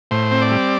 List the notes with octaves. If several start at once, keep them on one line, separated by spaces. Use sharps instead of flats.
A2 C5
C4
D5
G3